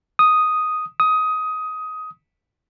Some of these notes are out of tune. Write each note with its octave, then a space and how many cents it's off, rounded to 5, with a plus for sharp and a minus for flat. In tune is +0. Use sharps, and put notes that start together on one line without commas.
D#6 +0
D#6 +15